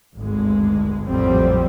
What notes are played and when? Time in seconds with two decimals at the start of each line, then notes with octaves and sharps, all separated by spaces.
0.16 G#1 D2 G2 G#3
1.08 A#1 F2 A2 F#3 G3 C4